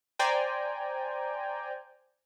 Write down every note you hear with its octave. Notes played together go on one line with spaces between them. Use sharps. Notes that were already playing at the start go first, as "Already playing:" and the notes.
C5 D5 G5 G#5 A#5